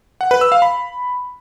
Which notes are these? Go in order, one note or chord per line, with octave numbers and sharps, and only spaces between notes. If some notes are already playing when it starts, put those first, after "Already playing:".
F#5
B4
E6
F5
B5